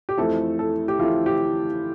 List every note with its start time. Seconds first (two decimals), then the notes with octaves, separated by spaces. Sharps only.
0.09 G4
0.18 F2 E3 A3 C4 E4 A4
0.59 A4
0.88 G4
0.99 F2 E3 A3 C4 E4 F4
1.26 G4